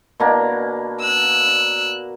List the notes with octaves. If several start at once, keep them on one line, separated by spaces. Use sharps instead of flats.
B2 A#3 D4
E6 F#6